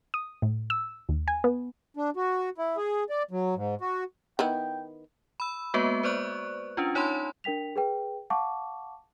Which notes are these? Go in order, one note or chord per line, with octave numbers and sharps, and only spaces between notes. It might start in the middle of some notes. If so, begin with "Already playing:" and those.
D#6
A2
E6
D#2
G#5
B3
D4
F#4
E4
G#4
D5
F#3
G#2
F#4
D#3 B3 E4 G5
B5 E6
G#3 A#3 B3 F#4 B4
B4 C5 D5 C#6 F#6
C#4 D4 F4
D#4 C#5 A5 B5 C6
D4 A#4 G5 B6 F7
G#4 B4 G5
F5 F#5 A5 C#6 D6